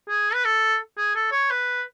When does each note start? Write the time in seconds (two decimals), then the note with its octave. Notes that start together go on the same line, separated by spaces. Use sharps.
0.09 G#4
0.34 B4
0.45 A4
0.97 G#4
1.15 A4
1.31 C#5
1.50 B4